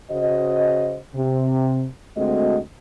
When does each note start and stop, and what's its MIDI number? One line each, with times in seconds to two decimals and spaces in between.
0.10 0.98 49
0.10 0.98 66
0.10 0.98 72
0.10 0.98 75
1.15 1.84 48
2.17 2.58 38
2.17 2.58 56
2.17 2.58 57
2.17 2.58 60
2.17 2.58 66
2.17 2.58 75